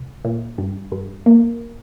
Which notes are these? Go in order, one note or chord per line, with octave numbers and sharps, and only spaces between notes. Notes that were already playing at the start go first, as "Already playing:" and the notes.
Already playing: C2
A#2
G2
G2
A#3